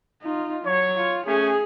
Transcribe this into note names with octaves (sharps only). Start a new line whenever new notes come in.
D#4 F4
F#3 C#5
F4
A3 C#4 G#4